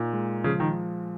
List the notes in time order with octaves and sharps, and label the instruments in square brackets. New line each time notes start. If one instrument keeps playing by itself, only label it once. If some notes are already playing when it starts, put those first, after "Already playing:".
Already playing: [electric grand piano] A#2 D#4
G#3
[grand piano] C#3 [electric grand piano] F3
[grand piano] D#3